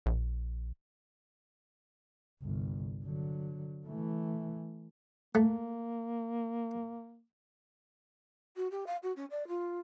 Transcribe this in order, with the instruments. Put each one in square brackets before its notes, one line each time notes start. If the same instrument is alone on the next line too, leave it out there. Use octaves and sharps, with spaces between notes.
[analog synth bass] A#1
[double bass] G1 C2
D3 F#3
E3 A3
[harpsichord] A3 [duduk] A#3
[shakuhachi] F#4
G4
F5
F#4
C#4
D5
F4